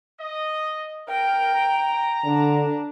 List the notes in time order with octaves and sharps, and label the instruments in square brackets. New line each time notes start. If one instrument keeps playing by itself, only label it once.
[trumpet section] D#5
[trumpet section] A#4 [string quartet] G5
[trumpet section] A#5
[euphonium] D3 [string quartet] D4